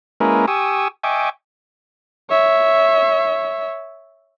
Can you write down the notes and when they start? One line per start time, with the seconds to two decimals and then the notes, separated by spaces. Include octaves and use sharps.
0.20 G#3 A#3 C#4 E4 A#4 B4
0.48 G4 G#5 C#6 D#6 E6
1.03 D#5 E5 G5 G#5 C#6 D6
2.30 C#5 E5